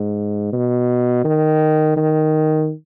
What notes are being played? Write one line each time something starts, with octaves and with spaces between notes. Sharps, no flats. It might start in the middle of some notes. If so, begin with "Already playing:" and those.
Already playing: G#2
B2
D#3
D#3